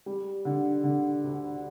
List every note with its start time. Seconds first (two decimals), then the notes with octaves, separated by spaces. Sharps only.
0.06 G3
0.45 D3
0.84 D3
1.24 D2